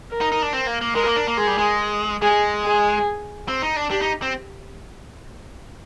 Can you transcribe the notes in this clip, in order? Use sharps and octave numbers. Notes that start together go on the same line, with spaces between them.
A#4
D#4
D#4
D4
C4
A#3
A#3
G#3 A#4
A#3
D4
A#3
G#3 G#4
G3
G#3
G#3 G#4
G#4
C4
D#4
D4
D4 G4
D#4
C4